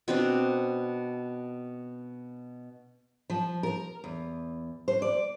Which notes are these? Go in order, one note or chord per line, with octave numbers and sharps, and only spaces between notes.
B2 C4 D4
F3
A#4
E2
C5
D5